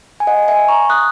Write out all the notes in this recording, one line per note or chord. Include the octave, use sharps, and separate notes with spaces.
G#5
D#5 F#5
E5 G#5
A#5 C#6
D#6 F#6